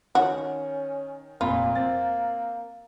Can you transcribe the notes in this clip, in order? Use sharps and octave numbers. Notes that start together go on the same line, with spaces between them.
D#3 C#4 F#4
F1 A#2 A#3 F4 B5
C4 A6